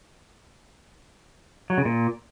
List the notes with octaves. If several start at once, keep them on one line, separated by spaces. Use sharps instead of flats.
F#3
C#3
A#2